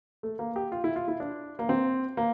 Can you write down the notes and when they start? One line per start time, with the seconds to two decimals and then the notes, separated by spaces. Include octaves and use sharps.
0.23 A3
0.39 A#3
0.56 G4
0.72 F4
0.84 E4
0.96 F4
1.08 E4
1.20 D4
1.59 A#3
1.69 C4
2.17 A#3